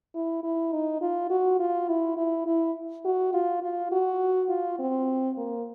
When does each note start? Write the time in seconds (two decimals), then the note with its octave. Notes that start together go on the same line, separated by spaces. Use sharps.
0.15 E4
0.43 E4
0.73 D#4
1.01 F4
1.30 F#4
1.60 F4
1.88 E4
2.17 E4
2.46 E4
3.05 F#4
3.34 F4
3.62 F4
3.92 F#4
4.49 F4
4.79 C4
5.37 A#3